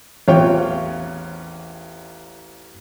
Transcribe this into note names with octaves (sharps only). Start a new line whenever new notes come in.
A1 E2 C4 F4 C#5 G5